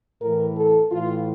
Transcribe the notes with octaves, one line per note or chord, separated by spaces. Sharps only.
A2 E3 A#4
A4
A2 E3 F4